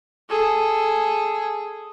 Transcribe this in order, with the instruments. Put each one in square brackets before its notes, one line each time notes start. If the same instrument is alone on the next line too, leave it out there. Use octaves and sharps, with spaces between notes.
[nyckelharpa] G#4 A4